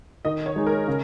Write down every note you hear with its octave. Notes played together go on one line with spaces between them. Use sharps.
D#3 D#5
C#5
G#3 D#4
A#4
C#3